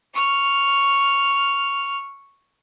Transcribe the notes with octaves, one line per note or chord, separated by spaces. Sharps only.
C#6 F6